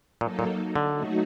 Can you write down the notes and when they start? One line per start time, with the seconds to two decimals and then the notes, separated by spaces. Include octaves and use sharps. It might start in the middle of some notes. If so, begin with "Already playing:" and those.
0.21 A#2 F#3 A#3 D#4 A4
0.39 A#2
0.76 D3
0.94 F#3 A3 D#4 F#4